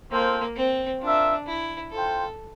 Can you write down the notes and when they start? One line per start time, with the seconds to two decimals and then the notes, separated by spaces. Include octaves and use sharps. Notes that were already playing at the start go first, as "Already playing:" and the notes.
0.11 A#3 C4 F4 A4 C5
0.57 C4
1.01 D4 F4 A#4 E5
1.47 E4
1.92 F4 A4 C5 G5